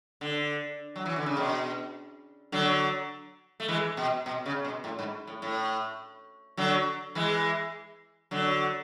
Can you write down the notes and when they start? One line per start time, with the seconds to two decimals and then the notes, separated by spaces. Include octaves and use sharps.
0.21 D3
0.96 F#3
1.06 E3
1.16 D3
1.26 C#3
1.37 B2
2.52 D3 F#3
3.60 A3
3.68 E3 G#3
3.97 B2
4.26 B2
4.46 C#3
4.65 B2
4.84 A2
4.99 G#2
5.27 A2
5.42 A2
6.57 D3 F#3
7.15 E3 G#3
8.31 D3 F#3